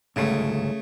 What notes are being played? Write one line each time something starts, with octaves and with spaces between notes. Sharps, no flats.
G1 C#2 G#2 C#3 A3